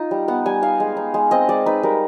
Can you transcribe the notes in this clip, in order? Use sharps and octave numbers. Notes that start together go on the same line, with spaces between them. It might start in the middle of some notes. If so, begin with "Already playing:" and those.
Already playing: D#4 F4
G3
B3 F#5
G3 G#5
D#4 F5
G#3
D#4
G#3
C4 D#5
G#3 D5
D#4 B4
G3 A#4